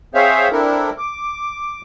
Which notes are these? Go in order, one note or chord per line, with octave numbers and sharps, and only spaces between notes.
C4 G#4 C5 C#5 E5 F5
C4 D4 E4 A4 A#4
D6